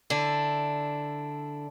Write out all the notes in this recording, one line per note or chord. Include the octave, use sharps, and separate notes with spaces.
D3 D4 E4